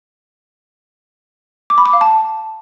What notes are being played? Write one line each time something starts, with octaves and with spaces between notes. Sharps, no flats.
D6
B5
D6
F5
A5